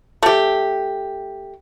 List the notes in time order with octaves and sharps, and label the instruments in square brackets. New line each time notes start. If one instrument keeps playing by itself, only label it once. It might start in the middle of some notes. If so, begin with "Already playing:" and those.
[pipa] A3 G4